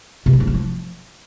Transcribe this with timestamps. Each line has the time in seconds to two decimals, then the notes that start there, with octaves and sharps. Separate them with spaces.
0.26 C3
0.33 D4
0.40 F3
0.47 C#4
0.54 F3